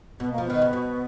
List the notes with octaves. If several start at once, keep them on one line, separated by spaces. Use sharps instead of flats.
B2 B3
A#3
F3
D#3 B3
C#3
B2